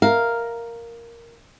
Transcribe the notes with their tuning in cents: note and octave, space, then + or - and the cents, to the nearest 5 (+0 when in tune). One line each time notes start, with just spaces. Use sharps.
A#4 +0 F5 +0